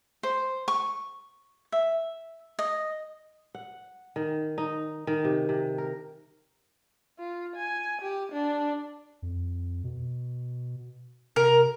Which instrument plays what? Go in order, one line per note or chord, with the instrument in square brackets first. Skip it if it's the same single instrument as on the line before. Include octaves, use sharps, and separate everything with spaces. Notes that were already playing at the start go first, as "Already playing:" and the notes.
[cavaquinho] C5
C#6
E5
D#5
[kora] F#5
D#3
D#4
D#3
C3
C3
A#4
[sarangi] F4
G#5
G4
D4
[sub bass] F2
B2
[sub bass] C3 [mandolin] A#4